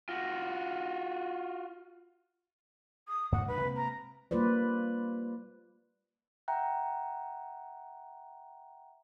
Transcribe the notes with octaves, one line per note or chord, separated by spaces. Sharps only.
F4 F#4
D#6
G2 A3 A#3 F#5
C#2 G2 G3 B4
C3 G#3 A#3
A#5
G3 A#3 F4 B4 C5 D5
E5 F#5 G5 A#5 F#6